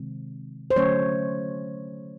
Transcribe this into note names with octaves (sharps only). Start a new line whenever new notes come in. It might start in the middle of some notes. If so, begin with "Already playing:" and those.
Already playing: C3 D#3 G#3 C4
C5
D3 F#3 A3 C#4 C#5